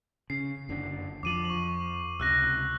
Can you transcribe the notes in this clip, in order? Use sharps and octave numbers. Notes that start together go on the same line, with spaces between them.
C#3 C7
F#1 D3
F2 F3 D6 D#7 F#7
C#6 F#7
C#2 C3 E6 F#6 A#6